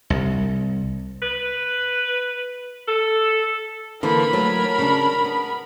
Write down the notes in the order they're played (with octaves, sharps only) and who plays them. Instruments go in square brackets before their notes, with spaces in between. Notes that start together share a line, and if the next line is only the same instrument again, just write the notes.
[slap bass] C2
[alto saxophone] B4
A4
[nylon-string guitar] D3 E3 A#3 [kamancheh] A#4 B5
[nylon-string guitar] F#3 A3
C#3 D4
B3